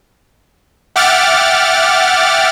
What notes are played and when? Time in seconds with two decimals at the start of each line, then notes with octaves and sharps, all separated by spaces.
0.96 E5 F#5 G5 D6 F6 A6